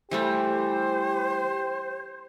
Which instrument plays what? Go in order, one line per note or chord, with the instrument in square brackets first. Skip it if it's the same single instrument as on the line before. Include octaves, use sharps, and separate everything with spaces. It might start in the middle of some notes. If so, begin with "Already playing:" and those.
[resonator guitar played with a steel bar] E3 G3 A3 [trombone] G4 [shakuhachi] C5